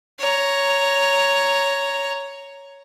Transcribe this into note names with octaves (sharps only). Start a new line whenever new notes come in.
C#5 A#5